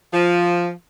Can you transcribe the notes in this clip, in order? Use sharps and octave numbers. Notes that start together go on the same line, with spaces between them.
F3